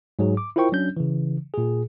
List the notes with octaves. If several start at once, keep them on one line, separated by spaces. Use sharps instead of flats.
G#2 F#3 G#4
D6
E4 F4 A#4 C5 G5 C#6
F#3 C#4 D4 G6
C#3 E3
A#2 G#4